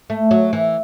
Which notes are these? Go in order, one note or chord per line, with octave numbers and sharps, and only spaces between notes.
A3
F#3
E3